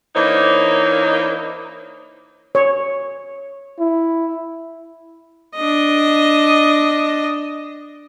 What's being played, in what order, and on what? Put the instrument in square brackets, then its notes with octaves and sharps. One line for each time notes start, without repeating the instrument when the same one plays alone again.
[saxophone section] E3 A#3 D4 D#4 C5 C#5
[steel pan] C#5
[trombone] E4
[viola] D4 D#5